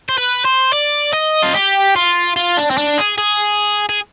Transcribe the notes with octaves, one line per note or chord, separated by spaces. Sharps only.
C5
B4
C5
D5
D#5
F4
G4
F4
F4
D4
C4
D4
G#4
G#4
G#4